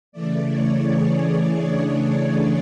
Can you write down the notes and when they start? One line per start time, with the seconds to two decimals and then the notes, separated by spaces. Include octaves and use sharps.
0.12 C#3 E3 A3 D5
0.49 C#5
0.86 G#4
1.60 D4